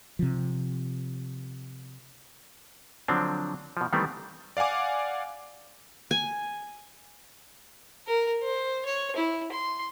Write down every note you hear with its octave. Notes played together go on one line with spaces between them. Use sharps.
C3 F3
D3 F3 F#3 C4 D4
B2 F3
D#3 E3 G3 A3 B3 C4
D5 F5 F#5 G#5 D6
G#5
A#4
C5
C#5
E4
C6